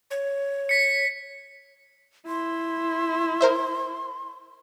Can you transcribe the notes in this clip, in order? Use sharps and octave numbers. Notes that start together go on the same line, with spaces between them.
C#5
B6 C#7
E4 C6
A#4 C5 E5